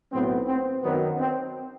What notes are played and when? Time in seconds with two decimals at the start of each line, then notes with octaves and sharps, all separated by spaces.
0.11 B1 A2 F#3 B3 C4
0.47 C4
0.83 F#2 D#3 F#3 B3
1.19 C4